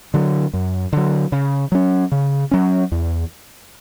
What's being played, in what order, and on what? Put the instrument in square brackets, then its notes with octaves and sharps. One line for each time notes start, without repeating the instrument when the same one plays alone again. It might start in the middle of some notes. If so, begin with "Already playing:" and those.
[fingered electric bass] D3 F#3
F#2
D3 F#3
C#3
F#3 C#4
C#3
F#3 C#4
E2